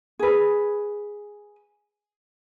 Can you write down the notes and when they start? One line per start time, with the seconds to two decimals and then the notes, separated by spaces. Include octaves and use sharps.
0.19 G#4 B4